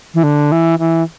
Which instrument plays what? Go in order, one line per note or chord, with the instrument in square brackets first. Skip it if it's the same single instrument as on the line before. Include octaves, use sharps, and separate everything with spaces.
[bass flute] E3
D3
E3
E3